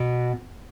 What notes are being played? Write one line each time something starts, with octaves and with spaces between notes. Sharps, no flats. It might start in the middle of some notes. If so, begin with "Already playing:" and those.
Already playing: B2